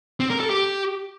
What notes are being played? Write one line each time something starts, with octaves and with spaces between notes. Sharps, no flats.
C4
A#4
A4
G4